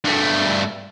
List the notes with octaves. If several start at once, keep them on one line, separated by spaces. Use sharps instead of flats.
G2 A3